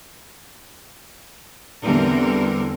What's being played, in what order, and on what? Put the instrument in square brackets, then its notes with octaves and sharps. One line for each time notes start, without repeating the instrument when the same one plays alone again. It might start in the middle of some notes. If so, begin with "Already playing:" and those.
[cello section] E2 D3 E3 G3 C4 A#4